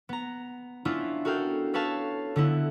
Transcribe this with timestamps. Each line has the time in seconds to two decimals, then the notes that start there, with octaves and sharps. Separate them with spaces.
0.09 B3 A#5
0.85 B3 C#4 D4 E4 F4
1.25 F#4 A4 A#4 F5 G5
1.73 A4 B4 C#5 F5 A5
2.36 D3 B3 E4